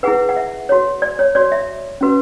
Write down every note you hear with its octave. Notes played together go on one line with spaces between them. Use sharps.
E4 G#4 B4 F#5
F#5
E5
F#4 C#5
D5
C#5
F#4 C#5 D5
E5
C#4 F#4 B4